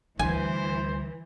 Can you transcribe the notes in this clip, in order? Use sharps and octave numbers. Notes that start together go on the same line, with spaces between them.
D2 E3 G3 C5 G#5